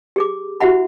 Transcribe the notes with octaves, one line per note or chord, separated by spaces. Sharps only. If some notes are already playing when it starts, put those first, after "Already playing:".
G4 G#4 D6
E4 F#4 G4 E5 F#5 B5